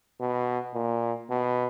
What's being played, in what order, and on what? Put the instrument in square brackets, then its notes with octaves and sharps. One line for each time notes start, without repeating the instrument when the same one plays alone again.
[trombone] B2
A#2
B2